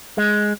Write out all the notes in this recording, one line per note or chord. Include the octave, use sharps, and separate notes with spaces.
G#3